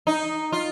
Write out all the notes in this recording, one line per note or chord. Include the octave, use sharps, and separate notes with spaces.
D#4
F4